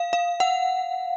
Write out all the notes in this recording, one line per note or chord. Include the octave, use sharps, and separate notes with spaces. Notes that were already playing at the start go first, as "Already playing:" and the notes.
Already playing: F5
F5
F#5